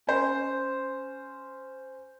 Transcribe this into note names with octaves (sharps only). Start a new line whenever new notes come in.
C#4 C5